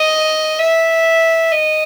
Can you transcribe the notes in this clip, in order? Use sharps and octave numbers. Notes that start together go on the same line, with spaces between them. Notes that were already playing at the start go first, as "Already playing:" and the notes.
Already playing: D#5
E5
D#5